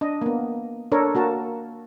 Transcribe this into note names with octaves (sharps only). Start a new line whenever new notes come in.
D4 D#5
A#3 B3
D4 A4 A#4 C#5
A#3 F#4 A#4 A5